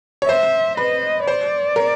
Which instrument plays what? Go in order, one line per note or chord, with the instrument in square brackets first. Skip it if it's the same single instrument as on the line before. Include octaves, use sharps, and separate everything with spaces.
[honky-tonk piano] C#5
[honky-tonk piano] C5 [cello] E5
[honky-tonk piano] B4 [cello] D#5
[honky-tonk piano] C5 [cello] D5
[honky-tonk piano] A#4